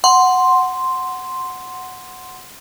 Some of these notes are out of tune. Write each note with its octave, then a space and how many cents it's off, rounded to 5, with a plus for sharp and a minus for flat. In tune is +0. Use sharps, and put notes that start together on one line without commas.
F#5 +0 C6 +0